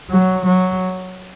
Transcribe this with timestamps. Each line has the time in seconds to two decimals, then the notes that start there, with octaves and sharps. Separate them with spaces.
0.10 F#3
0.46 F#3